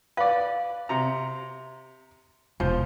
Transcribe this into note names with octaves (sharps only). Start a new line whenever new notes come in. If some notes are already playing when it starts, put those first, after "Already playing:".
B4 D5 F5
C3 A#5
E1 F3 C5